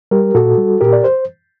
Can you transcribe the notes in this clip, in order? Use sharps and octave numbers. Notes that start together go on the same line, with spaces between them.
G3 G4 A#4
A#2 F#4 A4
G3
A#2 G4 A#4
D5
C5